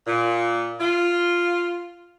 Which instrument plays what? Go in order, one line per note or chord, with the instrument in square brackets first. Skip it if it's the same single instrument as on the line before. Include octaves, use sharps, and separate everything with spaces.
[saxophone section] A#2
F4